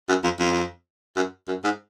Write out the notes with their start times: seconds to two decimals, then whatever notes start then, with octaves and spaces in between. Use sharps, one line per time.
0.09 F#2
0.23 F2
0.39 F2
1.16 F#2
1.48 F#2
1.64 G#2